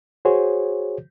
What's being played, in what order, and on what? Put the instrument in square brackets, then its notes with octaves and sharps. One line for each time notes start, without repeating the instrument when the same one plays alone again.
[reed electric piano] F#4 G#4 C5 C#5